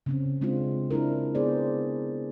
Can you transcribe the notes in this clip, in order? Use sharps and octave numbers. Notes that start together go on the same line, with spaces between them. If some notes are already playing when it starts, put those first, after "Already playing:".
C#3 C4 C#4
G#3 C4 D4 F4
C4 D4 E4 A#4
B3 G#4 C5 D5